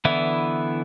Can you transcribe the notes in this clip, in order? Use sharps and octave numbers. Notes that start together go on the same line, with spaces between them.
D3 E3 B3 E4